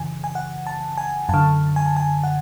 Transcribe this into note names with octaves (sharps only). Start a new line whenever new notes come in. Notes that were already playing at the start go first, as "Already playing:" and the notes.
Already playing: F#2 C#3 E3 G#5
G#5
F#5
A5
G#5
F#2 D3 A5
G#5
A5
G#5
F#5